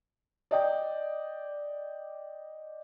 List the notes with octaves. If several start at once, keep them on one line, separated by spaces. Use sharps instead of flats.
D5 D#5 G5